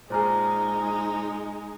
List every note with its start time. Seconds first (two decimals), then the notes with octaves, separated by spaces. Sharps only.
0.10 A#2 G#3 D#4 G#4 C5 A#5 F6